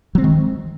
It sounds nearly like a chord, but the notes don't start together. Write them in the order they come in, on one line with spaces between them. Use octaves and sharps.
F#3 C4 G#3 D#3